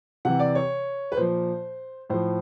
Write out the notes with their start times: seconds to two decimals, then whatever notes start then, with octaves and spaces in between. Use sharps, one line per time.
0.25 C3 E3 F#5
0.40 D5
0.55 C#5
1.12 B4
1.17 A#2 F3 C5
2.10 A2 F3 C5